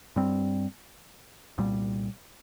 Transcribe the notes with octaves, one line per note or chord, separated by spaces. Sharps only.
G2 G3 C4
C2 A#2 G3